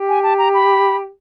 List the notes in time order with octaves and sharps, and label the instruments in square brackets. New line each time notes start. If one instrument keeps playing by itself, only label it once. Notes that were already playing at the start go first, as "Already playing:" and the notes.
Already playing: [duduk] G4
[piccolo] G#5
A5
A#5
B5